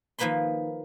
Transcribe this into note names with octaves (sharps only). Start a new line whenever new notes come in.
D#3 F3 A#3 B4 B5 C6